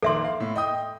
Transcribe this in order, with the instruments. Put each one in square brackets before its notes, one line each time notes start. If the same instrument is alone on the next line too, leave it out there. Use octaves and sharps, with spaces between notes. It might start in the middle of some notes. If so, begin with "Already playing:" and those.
[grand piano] A#1 D#3 D6 [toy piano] A4 E5 C6
[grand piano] F5
A2
D#5 G5 D#6